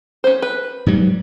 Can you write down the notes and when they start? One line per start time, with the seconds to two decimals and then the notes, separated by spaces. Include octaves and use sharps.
0.24 C#4 C5
0.42 B4
0.86 G#2 F#3 G3